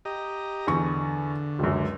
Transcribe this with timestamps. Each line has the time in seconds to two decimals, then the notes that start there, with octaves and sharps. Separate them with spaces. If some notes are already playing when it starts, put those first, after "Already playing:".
0.05 G4 D#5 A#5
0.67 E2 D3 C#6
1.59 C#2 F#2